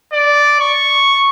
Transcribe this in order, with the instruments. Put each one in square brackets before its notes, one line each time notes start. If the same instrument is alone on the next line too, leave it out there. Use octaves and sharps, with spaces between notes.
[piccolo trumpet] D5
C#6